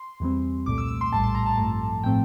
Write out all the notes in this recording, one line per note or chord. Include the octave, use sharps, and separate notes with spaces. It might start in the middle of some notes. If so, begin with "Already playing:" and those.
Already playing: C6
E2 E3 G3 C4
C2 A#2 A3 D6
E6
E6
C6
A#1 A2 G3 A5
C6
A#5
A5
G2 F3 A3
A2 F3 A3 C4 G5